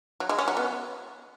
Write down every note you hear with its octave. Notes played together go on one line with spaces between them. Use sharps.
F#3
G#3
C#4
F#3
B3